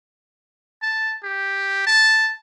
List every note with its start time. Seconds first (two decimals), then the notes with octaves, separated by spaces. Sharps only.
0.82 A5
1.24 G4
1.87 A5